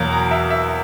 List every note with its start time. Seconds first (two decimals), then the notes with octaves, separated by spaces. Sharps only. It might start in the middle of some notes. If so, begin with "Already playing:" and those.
Already playing: E2 B2 F#3 A#3
0.13 A#5
0.31 E5
0.50 E5